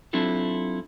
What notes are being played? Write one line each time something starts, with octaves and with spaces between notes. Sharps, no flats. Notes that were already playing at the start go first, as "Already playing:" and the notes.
F#3 C4 D4 E4 F4 A4